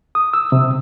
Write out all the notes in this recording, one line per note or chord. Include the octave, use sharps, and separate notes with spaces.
D#6
E6
C3